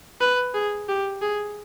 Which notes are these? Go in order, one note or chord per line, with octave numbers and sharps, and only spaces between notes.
B4
G#4
G4
G#4